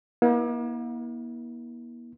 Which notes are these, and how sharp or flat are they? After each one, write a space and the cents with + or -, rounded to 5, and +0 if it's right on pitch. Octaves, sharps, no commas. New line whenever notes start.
A#3 +45 E4 -35